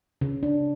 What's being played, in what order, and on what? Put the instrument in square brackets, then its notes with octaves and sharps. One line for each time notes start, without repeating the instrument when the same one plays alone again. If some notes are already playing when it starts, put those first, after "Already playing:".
[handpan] C#3
D4